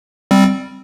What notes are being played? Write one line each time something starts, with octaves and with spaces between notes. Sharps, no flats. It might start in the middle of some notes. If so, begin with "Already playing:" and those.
G3 C4